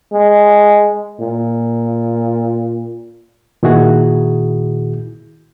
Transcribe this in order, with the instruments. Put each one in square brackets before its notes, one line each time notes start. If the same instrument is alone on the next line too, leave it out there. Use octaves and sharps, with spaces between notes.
[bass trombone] G#3
A#2
[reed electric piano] A#2 D#3 E4 F#4 G#4